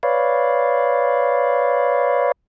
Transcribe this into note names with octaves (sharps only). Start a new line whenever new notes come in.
B4 C#5 D5 F5